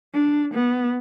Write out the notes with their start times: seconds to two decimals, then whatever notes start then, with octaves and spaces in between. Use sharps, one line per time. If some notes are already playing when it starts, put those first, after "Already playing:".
0.14 D4
0.54 B3